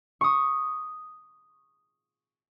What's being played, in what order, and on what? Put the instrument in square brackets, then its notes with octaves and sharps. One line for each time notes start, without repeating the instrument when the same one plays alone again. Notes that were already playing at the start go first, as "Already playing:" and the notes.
[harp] C#6 D#6